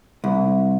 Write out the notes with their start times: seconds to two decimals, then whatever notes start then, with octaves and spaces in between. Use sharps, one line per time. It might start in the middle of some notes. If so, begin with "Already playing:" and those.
0.24 C2